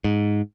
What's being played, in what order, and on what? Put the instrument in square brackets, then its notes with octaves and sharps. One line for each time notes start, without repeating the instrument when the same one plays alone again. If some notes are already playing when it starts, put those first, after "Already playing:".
[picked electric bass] G#2